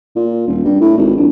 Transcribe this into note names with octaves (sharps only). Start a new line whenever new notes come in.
A#2
D#1
G2
A2
G#1
A#1